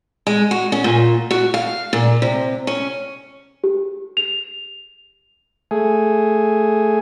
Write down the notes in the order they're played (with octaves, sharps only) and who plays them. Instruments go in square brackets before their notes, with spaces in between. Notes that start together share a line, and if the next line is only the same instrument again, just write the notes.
[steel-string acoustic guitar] G#3
F#4
C#4
A#2
F#4
F5
A#2
C3
C#4
[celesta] G4
F7
[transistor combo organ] A3 G#4